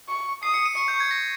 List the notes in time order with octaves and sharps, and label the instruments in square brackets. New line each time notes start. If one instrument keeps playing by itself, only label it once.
[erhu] C#6
[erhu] D#6 [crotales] C7
[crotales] C#7
D#7
[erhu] C#6 [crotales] C#7
[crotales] G6
G#6
A#6